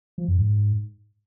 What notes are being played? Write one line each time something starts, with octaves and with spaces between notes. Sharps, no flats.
F3
F#2
G#2